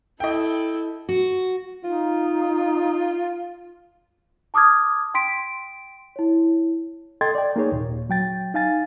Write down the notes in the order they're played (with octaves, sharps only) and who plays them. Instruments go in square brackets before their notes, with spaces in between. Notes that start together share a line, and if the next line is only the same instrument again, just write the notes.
[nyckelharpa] E4 A4 [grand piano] D#5 G5
[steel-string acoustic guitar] F#4
[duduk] D#4 [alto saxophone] F4
[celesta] A5 D6 D#6 F6 G#6
G5 C6 B6 D7
E4 C#5
[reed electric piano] A4 D#5 G5 C6 G#6 A6
D5 G5
A#3 D#4 G#4 C#5
D#2 A#2
F#3 G5 A6
D#4 F5 G#5 A6